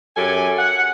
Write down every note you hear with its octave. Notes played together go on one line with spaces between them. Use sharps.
F#2 G4 A4 G#5
F#5